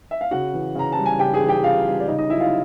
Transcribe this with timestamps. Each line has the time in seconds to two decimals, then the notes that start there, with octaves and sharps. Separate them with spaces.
0.11 E5
0.21 F5
0.31 C#3 F#4 F#5
0.53 E3
0.75 C#3 A#5
0.92 A5
0.98 G3
1.06 G#5
1.19 C#3 G4 G5
1.34 G#4 G#5
1.41 E3
1.48 G4 G5
1.63 C#3 F4 F5
1.86 G3
2.00 D5
2.07 C#3 D#4 D#5
2.18 D#4 D#5
2.29 F#3 E4 E5
2.40 F4 F5